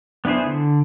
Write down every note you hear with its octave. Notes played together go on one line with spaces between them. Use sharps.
B3 D4 E4 G#4 C5
D3